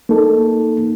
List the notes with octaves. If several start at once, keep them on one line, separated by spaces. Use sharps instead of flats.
A#3 D#4 A4